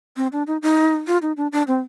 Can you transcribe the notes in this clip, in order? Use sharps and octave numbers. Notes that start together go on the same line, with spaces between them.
C4
D4
D#4
D#4
F4
D#4
D4
D4
C4